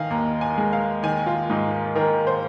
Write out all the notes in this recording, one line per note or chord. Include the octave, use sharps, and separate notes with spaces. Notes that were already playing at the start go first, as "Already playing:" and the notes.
Already playing: D#3 D#5 F5 G#5
D#2 A#5
G#5
G#3
F5
D#3 G#5
F4
G#2 D#4
D#3 A#4
C5